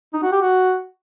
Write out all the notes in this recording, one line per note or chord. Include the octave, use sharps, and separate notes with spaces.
D#4
F#4
G4
F#4